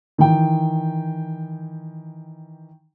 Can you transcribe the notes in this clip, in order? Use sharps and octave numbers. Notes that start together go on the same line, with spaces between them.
D#3 E3 G5